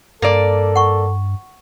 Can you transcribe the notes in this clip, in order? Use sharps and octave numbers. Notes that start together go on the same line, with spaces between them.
G2 A#3 A4 D5
F#5 C#6